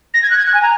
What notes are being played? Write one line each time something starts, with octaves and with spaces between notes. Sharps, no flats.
A#6
G#6
F#6
G#6
F#6
G#5
A#5